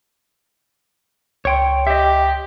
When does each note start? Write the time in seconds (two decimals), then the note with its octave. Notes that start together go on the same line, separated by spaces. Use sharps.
1.45 C#2 C#5 G5 C6
1.87 G4 D#5 E5